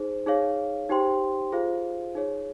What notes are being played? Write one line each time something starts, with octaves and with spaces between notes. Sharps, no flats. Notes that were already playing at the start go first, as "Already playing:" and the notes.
Already playing: D#4 G#4 C5
D#4 G#4 C#5 F5
D#4 G4 C5 G5 C6
F4 G#4 C5 F5
D#4 G#4 C#5